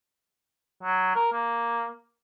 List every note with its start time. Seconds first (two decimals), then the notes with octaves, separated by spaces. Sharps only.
0.83 F#3
1.16 A#4
1.32 A#3